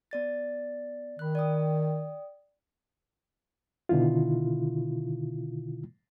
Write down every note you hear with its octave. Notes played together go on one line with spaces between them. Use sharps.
B3 D5 A6
D#3 B5 F#6
D5 G5 D#6
B2 D3 D#3 E4 F4